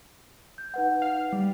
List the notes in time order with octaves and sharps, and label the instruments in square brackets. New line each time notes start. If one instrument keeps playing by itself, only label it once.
[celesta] G6
D#4 B4 F#5
[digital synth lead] F5
G3